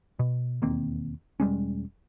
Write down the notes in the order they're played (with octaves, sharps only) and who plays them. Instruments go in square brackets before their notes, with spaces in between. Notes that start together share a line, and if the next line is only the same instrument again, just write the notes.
[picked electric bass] B2
E1 D#2 A#3 C4
E1 G3 G#3 C#4